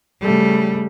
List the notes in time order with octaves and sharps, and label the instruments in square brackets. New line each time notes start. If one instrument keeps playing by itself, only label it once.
[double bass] C#3 A3 [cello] G3